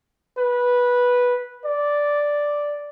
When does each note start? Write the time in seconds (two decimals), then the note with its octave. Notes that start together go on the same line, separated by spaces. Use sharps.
0.38 B4
1.66 D5